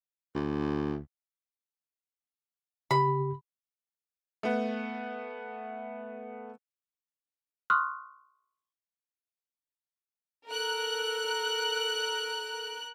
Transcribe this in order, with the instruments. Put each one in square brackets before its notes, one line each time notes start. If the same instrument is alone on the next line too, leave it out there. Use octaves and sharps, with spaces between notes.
[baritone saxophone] D2
[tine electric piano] C#3 G4 [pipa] B5
[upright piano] A3 B3
[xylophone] C6 C#6 D#6 F6 F#6
[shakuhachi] A4 [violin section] A#4 F#6